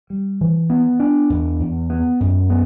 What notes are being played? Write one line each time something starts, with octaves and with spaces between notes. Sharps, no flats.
G3
E3
B3
D4
E2
E2
B3
F#2
B3